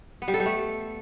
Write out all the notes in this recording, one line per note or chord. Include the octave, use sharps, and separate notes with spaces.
B3
G3
A4
G3
A3